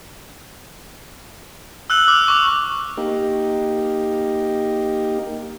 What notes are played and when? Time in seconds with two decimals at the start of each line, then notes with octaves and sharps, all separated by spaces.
1.90 E6 F#6 F#7
2.08 D6 F6
2.28 C#6 D6
2.97 A#3 D#4 G4